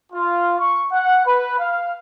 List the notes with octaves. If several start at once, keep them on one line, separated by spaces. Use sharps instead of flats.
F4
C#6
F#5
B4
F5